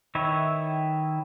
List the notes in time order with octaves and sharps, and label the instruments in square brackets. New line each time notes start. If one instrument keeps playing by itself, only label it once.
[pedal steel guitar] D#3 E4 B4 C#5 E5